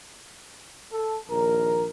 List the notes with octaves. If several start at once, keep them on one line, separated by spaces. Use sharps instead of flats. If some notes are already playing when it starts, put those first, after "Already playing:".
A4
A#1 D#2 A#4